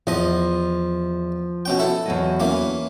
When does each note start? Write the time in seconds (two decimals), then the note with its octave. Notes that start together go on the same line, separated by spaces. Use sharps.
0.07 E2 F3 D#5
1.65 B2 C#4 G5
1.79 E4 A4
2.06 E2 F#3 D#5
2.40 E3 A#3 C#4